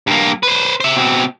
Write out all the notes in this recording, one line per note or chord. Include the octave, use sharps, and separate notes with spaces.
G2 A#3
B4 C5
C5 E5
B2 C4